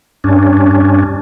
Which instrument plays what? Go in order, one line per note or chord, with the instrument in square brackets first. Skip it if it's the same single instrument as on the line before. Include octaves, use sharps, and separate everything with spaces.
[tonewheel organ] G2 C#4 D4